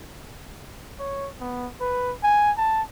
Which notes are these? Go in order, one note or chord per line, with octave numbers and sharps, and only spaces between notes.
C#5
B3
B4
G#5
A5